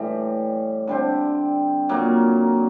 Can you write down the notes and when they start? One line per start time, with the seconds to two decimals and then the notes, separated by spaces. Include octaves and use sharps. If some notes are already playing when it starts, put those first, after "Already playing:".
Already playing: A2 E3 G3
0.87 D3 G3 C4
1.89 A#2 F#3 A#3